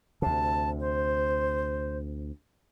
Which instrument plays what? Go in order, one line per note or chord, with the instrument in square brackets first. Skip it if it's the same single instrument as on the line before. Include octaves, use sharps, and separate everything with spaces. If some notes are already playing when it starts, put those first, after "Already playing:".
[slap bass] D2 C3 [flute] A5
[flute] C5